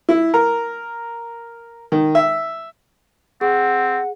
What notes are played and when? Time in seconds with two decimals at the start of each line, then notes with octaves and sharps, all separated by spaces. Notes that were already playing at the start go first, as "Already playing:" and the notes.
0.09 E4
0.34 A#4
1.92 D#3
2.15 E5
3.41 C4 G#4 F#5